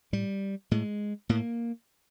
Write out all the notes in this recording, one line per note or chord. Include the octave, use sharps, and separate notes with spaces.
A2 G3
A2 G#3
A2 A#3